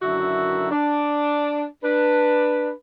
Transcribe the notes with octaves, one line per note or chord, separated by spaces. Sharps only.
F#2 D3 D#3 E4 F#4 E5
D4
D4 B4